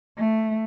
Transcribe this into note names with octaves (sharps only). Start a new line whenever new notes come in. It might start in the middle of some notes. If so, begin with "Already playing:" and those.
A3